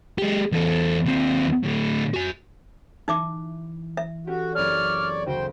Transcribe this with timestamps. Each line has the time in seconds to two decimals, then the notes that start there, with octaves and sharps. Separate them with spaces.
0.18 G#3 G4
0.52 E2 A4
1.06 D#2 C4
1.64 A2 D3
2.14 F#4 G#5
3.08 E3 D#4 E5 D6
3.97 E5
4.27 C#4 F#4 G4 A4
4.55 F#1 C4 C#5 D5 A5 F6
5.26 D2 C#3 F#4 C5 G5